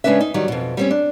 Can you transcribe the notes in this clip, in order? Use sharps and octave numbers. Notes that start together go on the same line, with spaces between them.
C#3 G#3 C#4 D4 B4 E5
D#4
D#3 F#3 G3
F2 B2
G3 C4 C#4
D4